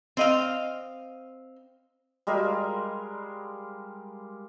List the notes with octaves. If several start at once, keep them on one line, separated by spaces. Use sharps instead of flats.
C4 D#5 F5
G3 G#3 A#4 F5